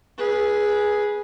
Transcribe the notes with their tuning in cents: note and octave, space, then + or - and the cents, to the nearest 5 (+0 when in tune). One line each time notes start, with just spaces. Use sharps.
G#4 +0 B4 -20